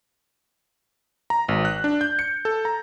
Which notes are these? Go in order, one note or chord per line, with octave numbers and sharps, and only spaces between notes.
A#5
G#1
F#6
D4
G6
C#7
A4
A#5